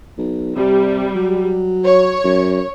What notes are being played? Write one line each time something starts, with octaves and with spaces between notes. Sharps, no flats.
B1
C3 G3
F#3
C#5
F#2